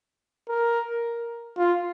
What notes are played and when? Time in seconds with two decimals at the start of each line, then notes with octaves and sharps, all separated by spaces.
0.49 A#4
1.58 F4